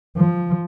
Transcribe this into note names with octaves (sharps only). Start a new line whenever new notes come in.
F3